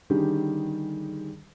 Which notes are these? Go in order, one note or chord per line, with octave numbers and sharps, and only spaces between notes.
D3 D#3 G3 C#4 G4 G#4